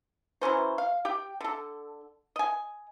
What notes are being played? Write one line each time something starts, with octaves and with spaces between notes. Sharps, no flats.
E3 F#3 C#4 C5
F5
G4 G5
D3 A4
D#5 G#5